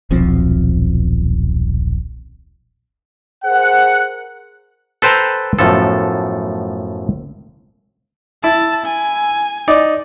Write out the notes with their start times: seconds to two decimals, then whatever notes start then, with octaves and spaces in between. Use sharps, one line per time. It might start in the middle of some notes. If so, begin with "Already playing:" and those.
0.11 D#1 B1 F3 C4
3.45 G#4 A#4 C5 F#5
5.02 A4 B4 C5 G5 A5 A#5
5.59 F#2 A2 F3 B3 A4
8.44 E4 A5
8.85 G#5
9.68 D#4 D5